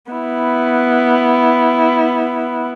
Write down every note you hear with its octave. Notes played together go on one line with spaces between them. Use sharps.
B3 E4